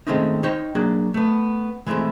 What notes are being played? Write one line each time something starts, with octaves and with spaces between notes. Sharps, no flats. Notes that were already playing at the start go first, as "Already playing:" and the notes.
D#3 G#3 A3 C4 C#4 D#4
D#4 C5 C#5 G5
F#3 A#3 D4 G#4
A3 B3
E3 G#3 A3 C4 E4